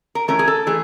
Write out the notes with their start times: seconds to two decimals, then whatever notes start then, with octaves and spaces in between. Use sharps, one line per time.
0.15 A#4
0.28 E3 A3 C#4 A#4
0.39 G#4
0.48 A4
0.67 E3 A3 G#4